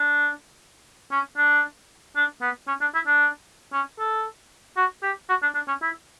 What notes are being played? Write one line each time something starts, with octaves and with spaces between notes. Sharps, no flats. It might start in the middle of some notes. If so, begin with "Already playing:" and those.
Already playing: D4
C#4
D4
D4
B3
C#4
D4
E4
D4
C#4
A4
F#4
G4
F#4
D4
D4
C#4
E4